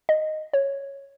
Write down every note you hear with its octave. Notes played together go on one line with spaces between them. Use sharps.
D#5
C#5